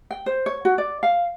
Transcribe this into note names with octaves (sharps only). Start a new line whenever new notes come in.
G5
C5
C#5
F#4
D5
F5